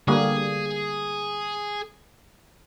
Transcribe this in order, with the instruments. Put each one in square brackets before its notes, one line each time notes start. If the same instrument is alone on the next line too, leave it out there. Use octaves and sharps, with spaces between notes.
[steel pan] D3 G3 A#3 [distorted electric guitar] G#4